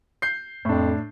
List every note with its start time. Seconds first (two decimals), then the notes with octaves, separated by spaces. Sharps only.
0.22 G6 C7
0.65 F2 A2 D4